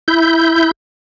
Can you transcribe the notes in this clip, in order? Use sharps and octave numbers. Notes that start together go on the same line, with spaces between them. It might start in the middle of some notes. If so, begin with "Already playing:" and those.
E4 G6